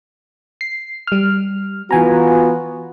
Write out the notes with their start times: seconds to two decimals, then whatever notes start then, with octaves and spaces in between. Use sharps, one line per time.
0.61 C7
1.07 G3 F6
1.91 E3 B3 F4 F#4 G#5 A#5